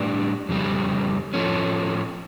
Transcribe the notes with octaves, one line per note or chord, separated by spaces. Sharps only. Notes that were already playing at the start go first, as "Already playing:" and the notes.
Already playing: A2 G3 D4
F2 C#3 G3
A2 F3 A3 C#4